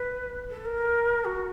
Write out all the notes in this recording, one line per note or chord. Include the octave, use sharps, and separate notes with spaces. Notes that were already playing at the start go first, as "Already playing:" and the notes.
Already playing: B4
A4
A#4
F#4